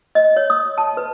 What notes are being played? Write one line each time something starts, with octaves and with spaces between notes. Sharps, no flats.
D#5
C#5
D#6
A5
B4